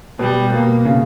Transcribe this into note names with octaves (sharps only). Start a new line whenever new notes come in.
B2 G3
B2 A#3
C#3